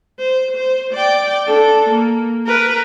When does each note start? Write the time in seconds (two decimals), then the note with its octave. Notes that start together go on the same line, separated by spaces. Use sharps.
0.19 C5
0.56 C5
0.93 D5 G5
1.47 D4 A4
1.89 A#3
2.46 A#4 B4